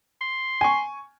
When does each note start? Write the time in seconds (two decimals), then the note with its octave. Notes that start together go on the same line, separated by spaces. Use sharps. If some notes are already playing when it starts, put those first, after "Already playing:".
0.21 C6
0.61 G#5 C#6